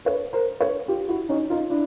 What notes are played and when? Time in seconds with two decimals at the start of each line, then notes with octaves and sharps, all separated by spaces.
0.05 B4 C#5
0.33 A#4 C5
0.61 B4 C#5
0.88 F4 G4
1.09 E4 F#4
1.29 C#4 D#4
1.50 D#4 F4
1.70 D4 E4